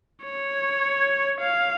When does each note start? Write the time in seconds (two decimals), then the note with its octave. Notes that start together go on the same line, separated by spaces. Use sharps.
0.24 C#5
1.41 F5